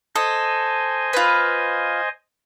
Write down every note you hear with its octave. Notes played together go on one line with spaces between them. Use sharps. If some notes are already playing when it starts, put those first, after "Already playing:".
A4 C5 D#5 G#5 D#6
F4 B4